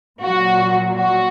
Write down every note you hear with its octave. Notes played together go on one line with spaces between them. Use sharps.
A#2 F#3 F#4
F#4